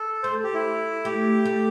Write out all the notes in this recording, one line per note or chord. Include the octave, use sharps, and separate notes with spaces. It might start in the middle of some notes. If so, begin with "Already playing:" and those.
Already playing: A4
A3 C5
G4
E4
A3 G4
A3